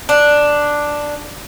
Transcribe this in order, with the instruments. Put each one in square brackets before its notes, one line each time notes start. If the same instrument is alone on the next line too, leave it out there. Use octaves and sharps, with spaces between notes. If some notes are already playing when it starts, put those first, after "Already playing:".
[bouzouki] D4